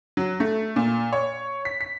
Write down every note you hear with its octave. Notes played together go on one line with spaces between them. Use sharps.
F#3
A3
A#2
C#5
B6
B6